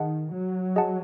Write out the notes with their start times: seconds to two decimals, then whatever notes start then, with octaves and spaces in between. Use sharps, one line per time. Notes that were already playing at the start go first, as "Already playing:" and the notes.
Already playing: D#3 G#4 D#5 F#5 A5
0.32 F#3
0.76 G#4 D#5 F#5 A5